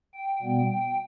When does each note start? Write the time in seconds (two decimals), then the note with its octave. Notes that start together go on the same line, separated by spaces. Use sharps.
0.13 G5
0.41 B2 G3 B3 G5
0.70 G5